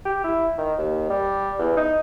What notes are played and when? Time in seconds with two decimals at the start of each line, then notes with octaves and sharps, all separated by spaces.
0.05 G4
0.24 E4
0.58 D#3
0.78 D#2
1.10 G3
1.59 E2
1.77 D#4